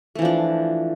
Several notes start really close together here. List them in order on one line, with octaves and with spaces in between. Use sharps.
A3 E3 F3 D4